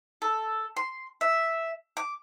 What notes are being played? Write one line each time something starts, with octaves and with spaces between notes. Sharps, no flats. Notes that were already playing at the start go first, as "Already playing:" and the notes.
A4
C6
E5
D6